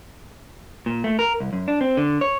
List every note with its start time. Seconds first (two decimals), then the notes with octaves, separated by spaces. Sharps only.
0.86 A#2
1.04 A3
1.19 A#4
1.40 C2
1.53 F#2
1.68 D4
1.81 C4
1.97 D3
2.21 C#5